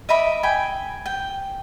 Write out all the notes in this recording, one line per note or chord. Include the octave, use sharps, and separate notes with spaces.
D#5 E5 B5 D6
G5 G#5 B5
G5